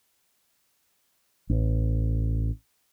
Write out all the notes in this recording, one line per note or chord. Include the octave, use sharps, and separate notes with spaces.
A1